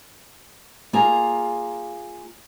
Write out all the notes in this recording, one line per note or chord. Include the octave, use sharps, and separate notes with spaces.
A#3 F4 G#4 G#5 A#5